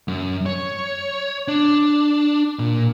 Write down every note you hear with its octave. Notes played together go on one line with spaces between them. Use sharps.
F#2
C#5
D4
A#2